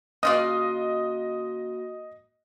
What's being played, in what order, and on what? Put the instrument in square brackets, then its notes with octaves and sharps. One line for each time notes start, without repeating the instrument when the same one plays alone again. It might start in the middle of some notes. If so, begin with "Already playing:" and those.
[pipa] C#3 F4 D5 [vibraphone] A#3 F#4 [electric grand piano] D#5 D#6